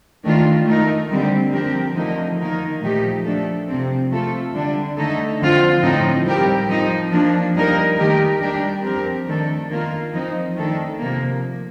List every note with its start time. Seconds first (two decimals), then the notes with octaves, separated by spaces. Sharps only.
0.24 D#3 A3 D4 F4
0.67 A3 D#4 A#4
1.10 D3 G3 C4 G4
1.53 F3 C4 G4 A#4
1.95 D3 F3 A3 D#4 A#4
2.39 D#3 A#3 D#4 A#4
2.81 A#2 F3 A3 D#4 G4
3.25 F3 A3 D4 A4
3.68 C3 F3 C4
4.10 A3 C4 F4 A4
4.54 D3 G3 D4
4.97 D3 A3 D#4 A4
5.40 D3 F3 C4 F4
5.82 A2 F3 C4 D#4
6.25 G3 C4 G4 A#4
6.69 F3 C4 D#4
7.12 F3 A#3 D4
7.55 G3 A#3 D#4 A#4
7.98 D#3 A3 D#4 G4 A#4
8.40 G3 D4 G4 A#4
8.84 F3 C4 G4 A#4
9.27 D#3 A3 D4 A4
9.69 D#3 A#3 F4 A#4
10.13 F3 C4 D#4
10.56 D#3 A3 D4 A4
10.99 C3 F3 A#3